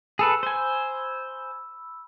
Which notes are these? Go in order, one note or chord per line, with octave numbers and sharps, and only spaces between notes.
G#4 A4 B4 B5 E6
C5 G#5